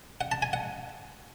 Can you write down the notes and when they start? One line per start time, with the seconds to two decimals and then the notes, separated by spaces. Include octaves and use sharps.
0.21 F#5
0.32 A5
0.42 G#5
0.53 F#5